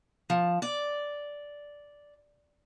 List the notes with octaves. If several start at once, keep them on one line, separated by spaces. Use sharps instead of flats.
F3
D5